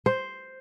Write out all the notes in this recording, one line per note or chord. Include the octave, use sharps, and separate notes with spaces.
C5